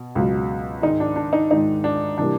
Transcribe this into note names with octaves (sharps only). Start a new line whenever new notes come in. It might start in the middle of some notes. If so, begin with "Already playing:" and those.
Already playing: B2
C#2 B2 F#3
G#2 D#3 G#3 D#4
D4
D4
D#4
G#2 D#3 G#3 D#4
D4
C3 E3 G3 A#3 D4